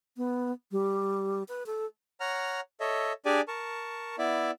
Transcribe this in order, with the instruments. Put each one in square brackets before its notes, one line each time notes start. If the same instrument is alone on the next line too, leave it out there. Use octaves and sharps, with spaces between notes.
[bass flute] B3
G3
B4
A4
[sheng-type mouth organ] C#5 F#5 A#5 F6
A4 C#5 D#5 E5
D4 G4 G#4 D5 G#5
A#4 A5 C#6
B3 E4 D5 E5